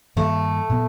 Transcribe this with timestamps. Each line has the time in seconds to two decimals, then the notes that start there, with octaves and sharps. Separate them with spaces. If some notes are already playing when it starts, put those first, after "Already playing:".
0.16 G2 D#3 G3 A3 A#3
0.69 A#2 F#3 B3